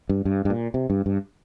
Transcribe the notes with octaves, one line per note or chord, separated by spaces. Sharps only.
G2
G2
G2
A#2
C3
G2
G2